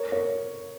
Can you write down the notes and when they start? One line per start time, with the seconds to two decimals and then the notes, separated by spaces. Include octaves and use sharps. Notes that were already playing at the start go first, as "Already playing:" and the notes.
Already playing: A#4 C#5
0.12 A#4 C#5